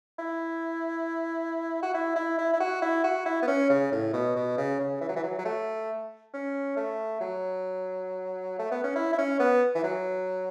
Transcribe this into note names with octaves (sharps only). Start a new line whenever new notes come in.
E4
F#4
E4
E4
E4
E4
F#4
E4
F#4
E4
B3
C#4
C#3
A2
B2
B2
C#3
C#3
E3
F#3
E3
F#3
F#3
A3
C#4
A3
F#3
A3
B3
C#4
E4
E4
C#4
B3
E3
F#3